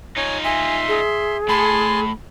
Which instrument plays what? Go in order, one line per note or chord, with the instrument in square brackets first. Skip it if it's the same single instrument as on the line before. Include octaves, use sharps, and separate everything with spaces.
[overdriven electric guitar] D#4 F4 [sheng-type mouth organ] C#5 G#5
[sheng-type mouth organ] E5 C6 [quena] G#5
[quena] G#4
[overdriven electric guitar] A2 [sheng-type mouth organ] G#5 A5 C6 [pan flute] B5